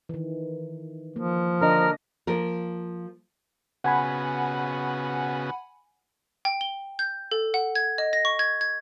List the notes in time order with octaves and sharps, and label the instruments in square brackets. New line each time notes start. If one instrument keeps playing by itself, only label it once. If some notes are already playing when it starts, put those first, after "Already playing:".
[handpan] D#3 E3
[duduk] F3 [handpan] A#3
[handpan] D3 D4 D#5 [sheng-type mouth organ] A#4
[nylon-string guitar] F3 A#3 A#4
[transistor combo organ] C#3 B3 F#4 [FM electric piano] F#5 G#5 B5
[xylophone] G5
G7
G6
A4
F#5
G#6
D#5
A#6
C#6
G#6
G#6